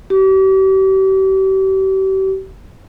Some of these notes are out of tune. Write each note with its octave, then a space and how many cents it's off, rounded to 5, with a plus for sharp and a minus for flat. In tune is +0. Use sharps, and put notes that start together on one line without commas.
G4 -40